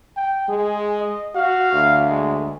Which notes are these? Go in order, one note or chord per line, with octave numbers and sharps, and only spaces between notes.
G5
G#3 G#4
D#5
F#4 F5
D2
G#3